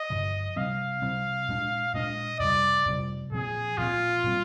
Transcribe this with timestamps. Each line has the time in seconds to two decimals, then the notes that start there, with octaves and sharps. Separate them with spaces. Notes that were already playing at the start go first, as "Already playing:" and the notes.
Already playing: D#5
0.10 G2 D3 F3
0.56 C3 G3 C4 F5
1.02 C3 G3 C4
1.49 A#2 G#3 D4
1.94 A#2 G#3 D4 D#5
2.40 F2 C3 G3 D5
2.86 F2 C3 G3
3.32 A#2 F3 C4 G#4
3.78 A#2 F3 C4 F4
4.24 A#2 G3 C4